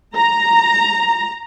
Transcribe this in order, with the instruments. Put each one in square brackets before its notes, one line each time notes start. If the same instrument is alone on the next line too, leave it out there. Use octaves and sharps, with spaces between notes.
[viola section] A#5